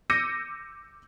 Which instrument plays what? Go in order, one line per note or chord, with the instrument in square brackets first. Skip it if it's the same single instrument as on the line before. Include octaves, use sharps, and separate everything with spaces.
[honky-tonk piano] D6 E6 G6 A#6 C#7 D#7